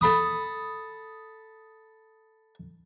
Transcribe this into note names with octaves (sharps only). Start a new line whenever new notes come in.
A4 B5 D#6